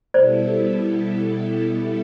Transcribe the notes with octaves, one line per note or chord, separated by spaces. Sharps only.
B2 G3 B3 E4 A4 C5 D5